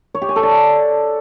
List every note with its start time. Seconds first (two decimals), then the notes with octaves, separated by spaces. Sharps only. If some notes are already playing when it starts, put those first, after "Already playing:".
0.15 C#5
0.22 G4
0.29 G#5
0.36 A4
0.43 D5